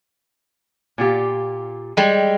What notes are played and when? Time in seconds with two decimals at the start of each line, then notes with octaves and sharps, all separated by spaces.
0.98 A#2 F4 G4
1.97 G3 G#3